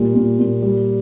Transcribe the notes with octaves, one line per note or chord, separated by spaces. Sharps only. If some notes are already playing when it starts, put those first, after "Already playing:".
Already playing: A#2 G3
A#2
A#2
G3